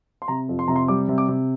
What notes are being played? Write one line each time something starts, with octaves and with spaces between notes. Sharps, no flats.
C6
C3 A#5
F2
C6
C3 A#5
C6
G3 D6
C3
D6
C3